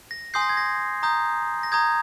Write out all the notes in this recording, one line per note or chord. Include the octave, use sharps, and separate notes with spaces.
A#6
G#5 C6 D#6 G6 C7
A#6
G#6
A#6
A#5 D#6 G6
A#6
A#5 D#6 G6 G#6